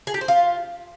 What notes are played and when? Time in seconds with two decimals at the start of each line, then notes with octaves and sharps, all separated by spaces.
0.07 G#4
0.14 G4
0.21 C5
0.28 F4